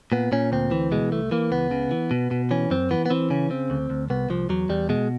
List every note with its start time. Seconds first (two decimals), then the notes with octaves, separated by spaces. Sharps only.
0.12 A#2 B3
0.32 A#2 C#4
0.52 D2 C4
0.71 E3
0.92 B2 G#3
1.12 C2 A3
1.31 E3 A#3
1.51 C#2 B3
1.71 C#3
1.91 E3
2.11 B2
2.31 B2
2.51 E3 C#4
2.71 F#2 C4
2.91 E3 B3
3.06 B3
3.10 E3 C4
3.30 C#3 C#4
3.50 C#3 C4
3.70 D2
3.90 D2
4.10 C2 B3
4.30 C2 F3
4.49 E2 F#3
4.69 E2 G3
4.89 B2 G#3